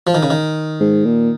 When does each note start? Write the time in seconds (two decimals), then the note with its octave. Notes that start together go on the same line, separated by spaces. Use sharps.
0.07 F3
0.15 D#3
0.23 C#3
0.30 D#3
0.80 G#2
1.05 A#2